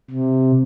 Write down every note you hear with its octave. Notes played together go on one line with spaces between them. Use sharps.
C3